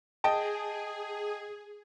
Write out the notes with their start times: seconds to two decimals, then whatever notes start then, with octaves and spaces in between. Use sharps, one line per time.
0.24 G#4 D#5 G5 A5